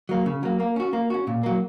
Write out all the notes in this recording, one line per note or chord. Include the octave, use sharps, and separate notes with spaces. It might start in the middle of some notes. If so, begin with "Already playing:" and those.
F#3 A#3
C#3
F#3 A#3
A#3
C#4 F#4
A#3
C#4 F#4
A#2
F#3 A#3